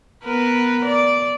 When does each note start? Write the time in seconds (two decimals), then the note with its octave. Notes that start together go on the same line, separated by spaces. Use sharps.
0.25 B3 A#4 B4
0.85 D5